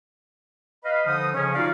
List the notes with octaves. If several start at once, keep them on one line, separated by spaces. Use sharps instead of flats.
B4 D#5 F5 B5
D3 F3 D#4 D#6
C#3 F3 C#4
D#4 F4 F#4 D5 F5